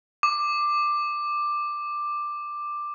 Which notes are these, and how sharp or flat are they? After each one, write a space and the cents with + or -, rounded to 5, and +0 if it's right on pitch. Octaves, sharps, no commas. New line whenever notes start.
D6 +10